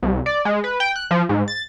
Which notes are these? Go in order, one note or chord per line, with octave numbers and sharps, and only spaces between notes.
C2
D5
G#3
B4
G5
F#6
F3
G#2
A6